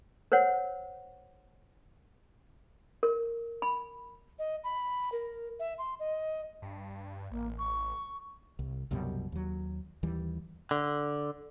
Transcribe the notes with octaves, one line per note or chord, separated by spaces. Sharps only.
A#4 C5 C#5 F#5
A#4
B5
D#5
B5
A#4
E5
C6
D#5
G2
A1 A#3
C#6
C2
C2 F#2 B2 G3
D#2 F#3
D#2 E3 G3
D3